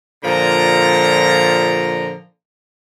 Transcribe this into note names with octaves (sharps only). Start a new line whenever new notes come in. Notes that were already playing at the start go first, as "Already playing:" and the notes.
A#2 D3 F3 A#5